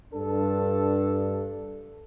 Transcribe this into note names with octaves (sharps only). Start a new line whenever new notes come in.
G2 D4 A4